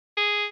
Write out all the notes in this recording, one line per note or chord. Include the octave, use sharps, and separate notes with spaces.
G#4